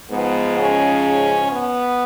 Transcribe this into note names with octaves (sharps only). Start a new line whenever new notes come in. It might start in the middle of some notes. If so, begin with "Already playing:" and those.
G#2 F3 G#3 B3
C#3 C#4
B3